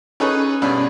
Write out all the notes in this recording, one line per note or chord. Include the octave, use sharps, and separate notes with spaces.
C#4 D#4 G#4 A4 B4 C#5
G2 B2 C#4 D4